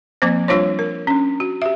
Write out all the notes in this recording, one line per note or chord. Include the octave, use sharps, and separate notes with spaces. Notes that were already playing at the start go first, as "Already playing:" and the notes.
F3 A#3 C4 C5
G3 D4 F4 C5 C#5
A#4
C#4 D4
F#4
G4 E5